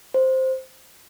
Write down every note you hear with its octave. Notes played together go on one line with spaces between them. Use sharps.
C5